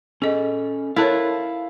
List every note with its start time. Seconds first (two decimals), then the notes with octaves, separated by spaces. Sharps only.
0.22 C#4 G#4 A4 D#5
0.96 E4 A4 A#4 C#5 F5 A5